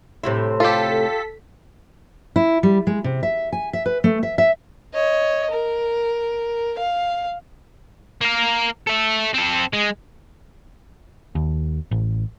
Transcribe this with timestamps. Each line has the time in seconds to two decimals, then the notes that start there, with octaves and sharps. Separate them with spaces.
0.24 A2 C3 E4
0.60 F4 G4 A4 B6
2.36 E4
2.63 G3
2.87 G#3
3.04 C3
3.23 E5
3.52 G#5
3.73 E5
3.86 B4
4.04 A3
4.23 E5
4.38 E5
4.94 C#5 D#5
5.50 A#4
6.78 F5
8.21 A#3 A#4
8.87 A4 E5
9.34 C4 A4
9.73 G#3
11.35 D#2
11.91 A1